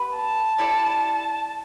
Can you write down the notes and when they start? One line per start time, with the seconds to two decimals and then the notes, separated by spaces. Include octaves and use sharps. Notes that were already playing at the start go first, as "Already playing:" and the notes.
Already playing: B3 G4 B4
0.16 A5
0.58 G3 E4 A4 D5